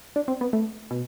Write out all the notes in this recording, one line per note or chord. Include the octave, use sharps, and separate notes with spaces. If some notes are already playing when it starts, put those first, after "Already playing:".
D4
C4
B3
A3
B2